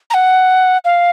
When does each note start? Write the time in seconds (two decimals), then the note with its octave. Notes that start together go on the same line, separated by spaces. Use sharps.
0.10 A#5
0.14 F#5
0.85 F5